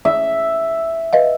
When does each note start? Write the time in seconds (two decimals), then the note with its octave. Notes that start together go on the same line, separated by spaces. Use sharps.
0.05 E5
1.13 B4 D#5 F5